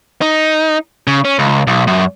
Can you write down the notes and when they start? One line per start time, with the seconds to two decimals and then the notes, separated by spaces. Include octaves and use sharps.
0.22 D#4
1.07 C#3
1.25 C#4
1.39 C#2
1.67 B1
1.87 F#2